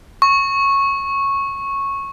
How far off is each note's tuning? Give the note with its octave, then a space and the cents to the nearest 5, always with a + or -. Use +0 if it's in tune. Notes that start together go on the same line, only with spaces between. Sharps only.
C#6 -10